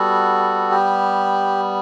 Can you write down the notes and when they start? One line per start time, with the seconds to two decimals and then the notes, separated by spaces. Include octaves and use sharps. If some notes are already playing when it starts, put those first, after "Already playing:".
Already playing: G3 B3 F#4 A4
0.71 G4